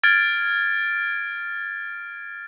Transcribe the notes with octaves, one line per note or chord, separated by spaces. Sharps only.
F6 G#6 A6 D7